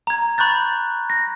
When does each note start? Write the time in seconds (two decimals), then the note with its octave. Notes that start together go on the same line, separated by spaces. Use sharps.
0.07 A#5 G#6
0.38 B5 C#6 F#6 G6 A6
1.10 A#6